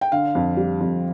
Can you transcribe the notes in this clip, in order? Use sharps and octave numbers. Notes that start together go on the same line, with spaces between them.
G5
D3 F5
F2
G3
F2